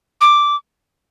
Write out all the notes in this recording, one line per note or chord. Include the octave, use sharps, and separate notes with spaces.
D6